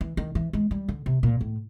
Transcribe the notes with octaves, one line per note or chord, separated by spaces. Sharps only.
E3
D#3
E3
G#3
G3
D3
C3
A#2
A2